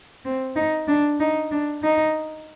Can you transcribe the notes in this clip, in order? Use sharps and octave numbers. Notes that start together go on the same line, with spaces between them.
C4
D#4
D4
D#4
D4
D#4